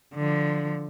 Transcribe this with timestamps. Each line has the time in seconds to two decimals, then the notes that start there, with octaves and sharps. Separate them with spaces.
0.14 D3 F3